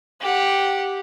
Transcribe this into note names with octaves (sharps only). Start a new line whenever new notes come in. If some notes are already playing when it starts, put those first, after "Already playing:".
G4 F#5